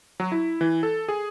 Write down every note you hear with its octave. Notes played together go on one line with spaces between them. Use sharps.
F#3
E4
E3
A4
G#4